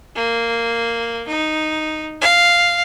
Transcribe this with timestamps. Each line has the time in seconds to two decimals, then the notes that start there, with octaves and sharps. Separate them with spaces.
0.16 A#3
1.28 D#4
2.21 F5